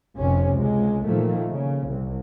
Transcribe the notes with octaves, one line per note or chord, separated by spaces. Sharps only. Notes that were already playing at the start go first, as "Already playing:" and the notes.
F1 C3 C#4
C#2 G#3
A#2 D#3 F3 A3 A#3
C#3
C2